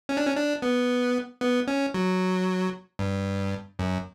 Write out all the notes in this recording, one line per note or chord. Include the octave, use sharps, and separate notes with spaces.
C#4
D4
C#4
D4
B3
B3
C#4
F#3
G2
F#2